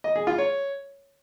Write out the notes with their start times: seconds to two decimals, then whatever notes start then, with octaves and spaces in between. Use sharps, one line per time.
0.04 D#5
0.16 G#4
0.27 F4
0.38 C#5